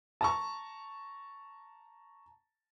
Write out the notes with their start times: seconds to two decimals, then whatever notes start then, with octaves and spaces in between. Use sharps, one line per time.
0.21 A5 A#5 C#6